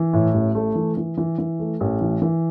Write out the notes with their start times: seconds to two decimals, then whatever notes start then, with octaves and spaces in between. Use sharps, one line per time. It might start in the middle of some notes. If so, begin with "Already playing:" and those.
Already playing: E3
0.13 A2
0.34 A1
0.55 A3
0.75 E3
0.97 E3
1.17 E3
1.38 E3
1.59 A3
1.81 A1
2.01 E3
2.22 E3